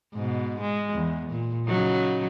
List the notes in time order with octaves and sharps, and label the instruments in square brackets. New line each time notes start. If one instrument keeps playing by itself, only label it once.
[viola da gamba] G#2 B2
G#3
E2
A#2
C#3 F#3 D#4